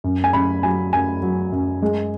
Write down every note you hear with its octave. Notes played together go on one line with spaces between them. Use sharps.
F#2
G#5
F#2 B5
F#3 G#5
F#2 G#5
F#3
F#2
G#3